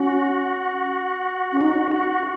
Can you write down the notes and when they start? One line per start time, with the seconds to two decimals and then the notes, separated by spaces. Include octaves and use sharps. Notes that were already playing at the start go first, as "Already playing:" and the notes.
Already playing: C#4 F#4
1.53 C#4
1.61 D#4 F#4
1.91 F#4